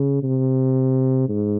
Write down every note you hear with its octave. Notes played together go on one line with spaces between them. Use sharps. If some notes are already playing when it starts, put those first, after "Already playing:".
Already playing: C#3
C3
G#2